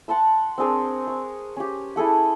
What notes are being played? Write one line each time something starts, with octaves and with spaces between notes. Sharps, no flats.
F#5 A5 C6 E6
C4 D4 G#4 A#4
C#6
C#4 G4
E4 G#4 A4 F#5